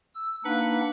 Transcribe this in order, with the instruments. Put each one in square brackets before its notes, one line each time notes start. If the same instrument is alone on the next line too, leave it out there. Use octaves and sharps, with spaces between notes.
[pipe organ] E6
[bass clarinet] A#3 [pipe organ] D4 D#4 F#5 [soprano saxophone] B4